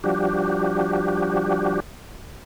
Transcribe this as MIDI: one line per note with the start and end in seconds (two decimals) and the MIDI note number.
0.04 1.80 53
0.04 1.80 55
0.04 1.80 62
0.04 1.80 66
0.04 1.80 67